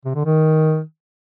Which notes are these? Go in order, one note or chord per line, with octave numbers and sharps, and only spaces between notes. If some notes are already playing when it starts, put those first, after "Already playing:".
C3
D3
D#3